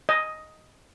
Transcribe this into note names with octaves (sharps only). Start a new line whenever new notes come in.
D#5